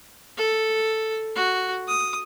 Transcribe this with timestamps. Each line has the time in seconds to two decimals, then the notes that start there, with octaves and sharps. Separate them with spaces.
0.37 A4
1.36 F#4
1.88 D#6